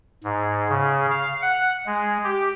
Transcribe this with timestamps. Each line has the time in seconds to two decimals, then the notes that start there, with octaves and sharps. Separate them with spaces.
0.24 G#2
0.69 C#3
1.10 F5
1.42 F#5
1.86 G#3
2.24 G4